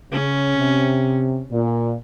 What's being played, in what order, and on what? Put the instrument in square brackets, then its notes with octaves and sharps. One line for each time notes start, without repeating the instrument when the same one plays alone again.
[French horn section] C#3 [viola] C#4
[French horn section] C3
A#2